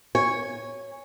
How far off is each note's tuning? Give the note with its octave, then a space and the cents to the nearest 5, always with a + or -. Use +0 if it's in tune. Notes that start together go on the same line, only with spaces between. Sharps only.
C#5 +0 G#5 -20